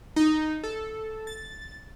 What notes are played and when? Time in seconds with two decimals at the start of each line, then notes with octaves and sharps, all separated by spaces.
0.16 D#4
0.64 A4
1.27 A6